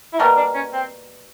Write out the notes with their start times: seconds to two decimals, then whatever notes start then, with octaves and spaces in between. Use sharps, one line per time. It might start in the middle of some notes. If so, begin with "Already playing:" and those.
0.13 E4
0.19 B2 G3 A#3 D#4
0.37 D4
0.54 C#4
0.73 C4